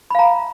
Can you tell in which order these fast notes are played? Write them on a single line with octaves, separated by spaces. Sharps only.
B5 F5 A#5